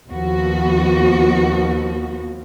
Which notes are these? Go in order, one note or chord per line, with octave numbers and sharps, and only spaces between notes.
D#2 F3 B3 F#4